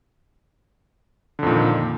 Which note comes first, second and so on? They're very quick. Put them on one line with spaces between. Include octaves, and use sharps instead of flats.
D3 F2 A#2 D#3